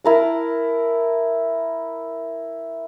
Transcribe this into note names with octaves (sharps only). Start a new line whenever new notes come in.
E4 A#4 A5